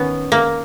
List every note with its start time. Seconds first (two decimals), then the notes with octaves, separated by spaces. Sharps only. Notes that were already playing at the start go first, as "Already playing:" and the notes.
Already playing: D#3 B3 C#4
0.32 A#3